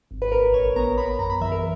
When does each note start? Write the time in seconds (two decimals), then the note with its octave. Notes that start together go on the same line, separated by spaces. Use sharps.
0.11 G#1
0.22 B4
0.32 A#1 A#4
0.54 A#1 C#5
0.76 B3 A#5
0.97 B3 B5
1.19 F#2 A#5
1.30 B5
1.41 E3 E5
1.52 A#4